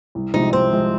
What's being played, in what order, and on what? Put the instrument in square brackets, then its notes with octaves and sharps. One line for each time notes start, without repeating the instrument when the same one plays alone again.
[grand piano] C2
[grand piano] C3 F3 G#3 [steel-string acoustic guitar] D#4
[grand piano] C2 [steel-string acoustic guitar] C4
[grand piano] C3 F3 G#3